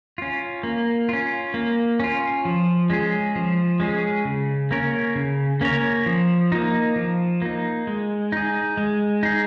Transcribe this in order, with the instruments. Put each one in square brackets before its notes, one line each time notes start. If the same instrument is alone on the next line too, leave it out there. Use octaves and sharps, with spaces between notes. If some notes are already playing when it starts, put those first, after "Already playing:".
[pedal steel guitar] C#4 F4
A#3
C#4 F4
A#3
C#4 F4
F3
G#3 C#4 G#4
F3
G#3 C#4 G#4
C#3
A#3 C#4 A#4 C#5
C#3
A#3 C#4 A#4 C#5
F3
A#3 D#4
F3
A#3 D#4
G#3
D#4 G#4
G#3
D#4 G#4